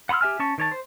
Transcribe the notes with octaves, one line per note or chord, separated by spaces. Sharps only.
F#5 B5 C6 E6 F6
G4 E5 G#5 F6
C#4 A5 C#6
D#3 C#5 A5
C5